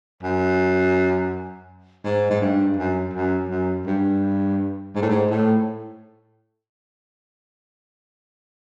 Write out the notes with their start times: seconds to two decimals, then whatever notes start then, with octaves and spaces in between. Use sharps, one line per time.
0.23 F#2
2.05 G#2
2.30 G#2
2.41 G2
2.77 F#2
3.13 F#2
3.49 F#2
3.86 G2
4.95 G#2
5.02 A2
5.09 G#2
5.30 A2